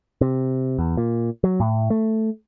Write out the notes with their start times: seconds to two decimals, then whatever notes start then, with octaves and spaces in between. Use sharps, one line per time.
0.21 C3
0.79 E2
0.97 A#2
1.44 F#3
1.60 A2
1.90 A3